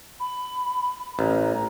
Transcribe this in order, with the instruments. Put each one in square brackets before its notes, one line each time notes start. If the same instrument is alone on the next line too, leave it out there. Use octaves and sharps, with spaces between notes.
[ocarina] B5
[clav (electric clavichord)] A1 [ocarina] A#5